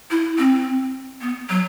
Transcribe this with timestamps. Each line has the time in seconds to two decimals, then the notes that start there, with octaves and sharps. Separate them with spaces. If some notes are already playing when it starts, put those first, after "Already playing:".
0.11 E4
0.38 C4
1.21 B3
1.50 F#3